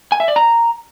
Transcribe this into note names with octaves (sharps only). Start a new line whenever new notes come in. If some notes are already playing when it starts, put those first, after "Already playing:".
G#5
E5
D5
A#5